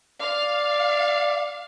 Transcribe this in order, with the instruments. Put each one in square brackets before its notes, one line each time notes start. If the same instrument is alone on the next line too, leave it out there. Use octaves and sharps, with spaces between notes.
[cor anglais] D5 [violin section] F5